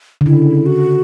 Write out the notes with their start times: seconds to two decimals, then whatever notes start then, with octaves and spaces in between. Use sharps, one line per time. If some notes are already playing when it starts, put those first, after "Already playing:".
0.21 D3
0.26 C#3 E4
0.66 F#4